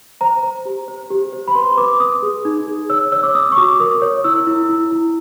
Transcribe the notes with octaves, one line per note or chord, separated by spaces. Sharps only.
C5 A#5
C5
G4
C5
G4
C5
B5
B4 C6
B4 D6
B4 D#6
G#4
D#4
G#4
C#5 E6
C#5 E6
D6
C#5 D#6
C#6
F#4 D6
A#4 D#6
C#5
E4 E6
E4
E4
E4